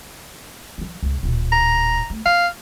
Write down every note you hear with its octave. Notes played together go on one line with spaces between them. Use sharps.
E3 F#3
C#2 C3
D1 A#2
A#5
A3
C4 F5